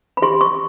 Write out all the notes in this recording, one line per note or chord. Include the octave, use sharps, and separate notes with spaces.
B5
G4 C6
C#6